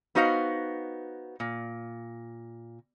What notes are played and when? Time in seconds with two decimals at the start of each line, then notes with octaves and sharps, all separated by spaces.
0.15 B3 D#4 F#4 C5 F5
1.40 A#2